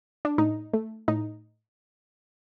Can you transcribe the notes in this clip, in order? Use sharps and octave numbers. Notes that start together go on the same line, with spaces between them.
D4
A2 D#4
A3
A2 D#4